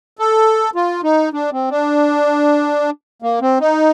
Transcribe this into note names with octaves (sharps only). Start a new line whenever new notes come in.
A4
F4
D#4
D4
C4
D4
A#3
C4
D#4